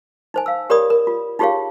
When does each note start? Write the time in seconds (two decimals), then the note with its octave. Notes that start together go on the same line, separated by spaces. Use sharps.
0.34 D#4 C5 G#5
0.46 F5 E6
0.70 G4 A#4 C#5 D5 B5 D#6
0.90 A#4
1.07 F4
1.39 D#4 F4 G4 G#4 C#5 F5